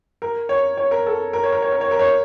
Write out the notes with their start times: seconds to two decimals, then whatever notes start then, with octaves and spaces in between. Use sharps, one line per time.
0.22 A#4
0.49 C#5
0.77 C#5
0.91 A#4
1.06 A4
1.33 A#4
1.43 C#5
1.52 A#4
1.62 C#5
1.72 A#4
1.81 C#5
1.91 A#4
1.99 C#5